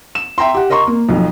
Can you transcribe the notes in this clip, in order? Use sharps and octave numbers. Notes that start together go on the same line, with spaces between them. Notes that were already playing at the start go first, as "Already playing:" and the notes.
E7
E5 G5 A#5 C6
G4 F#5
A#4 D#5 A#5 C6 C#6
A#3
B1 F2